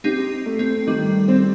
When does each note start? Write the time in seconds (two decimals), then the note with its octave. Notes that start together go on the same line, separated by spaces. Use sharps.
0.04 C4 D#4 G4
0.46 A3
0.59 C4
0.87 D#3 G3
1.28 C4